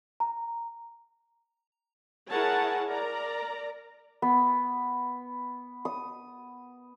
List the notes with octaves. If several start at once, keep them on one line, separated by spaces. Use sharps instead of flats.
A#5
E4 G#4 A#4 C#5 F#5 A5
A#4 D5 A#5
B3
D#6